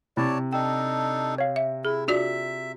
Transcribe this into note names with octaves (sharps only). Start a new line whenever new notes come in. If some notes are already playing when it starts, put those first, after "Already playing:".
C3 E4 C#5 D5 A5
D4 D#4 A4 G5
C#5 F5
E5
E4 G#4
D4 F4 F#4 D5 E5